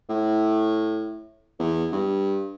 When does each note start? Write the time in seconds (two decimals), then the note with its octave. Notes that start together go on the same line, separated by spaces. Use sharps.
0.09 A2
1.59 E2
1.92 G2